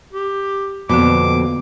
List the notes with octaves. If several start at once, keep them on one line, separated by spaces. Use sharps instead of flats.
G4
F2 B2 D3 A#3 B3 D6